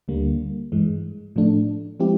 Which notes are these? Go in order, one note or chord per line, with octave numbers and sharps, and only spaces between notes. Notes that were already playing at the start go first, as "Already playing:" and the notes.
D2 D3 G3 A#3
G2 E3 G#3
A2 F3 A3 D4
F3 G#3 C4 E4 G4